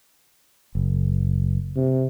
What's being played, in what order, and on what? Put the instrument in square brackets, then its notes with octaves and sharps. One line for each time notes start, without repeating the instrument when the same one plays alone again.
[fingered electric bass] F#1
[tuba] C3